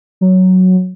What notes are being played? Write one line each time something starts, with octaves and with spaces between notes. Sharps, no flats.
F#3